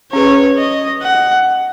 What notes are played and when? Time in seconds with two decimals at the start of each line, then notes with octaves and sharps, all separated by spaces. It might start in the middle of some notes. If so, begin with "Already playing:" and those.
0.13 C#4 G#4 B4 C#5
0.58 D#5
1.03 F#5